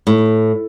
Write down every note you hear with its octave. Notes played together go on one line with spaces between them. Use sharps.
A2